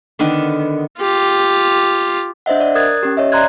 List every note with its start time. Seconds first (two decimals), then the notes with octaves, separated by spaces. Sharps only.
0.19 D3 D#3 B3
1.01 F4 G4
2.46 D4 C5 D#5 E5 F#5
2.60 D5
2.75 A#4 D#6 F#6 G#6 A6
3.03 C#4 G4
3.17 C#5 D#5 E5
3.32 D5 D#5 A#5 C6 F#6 G#6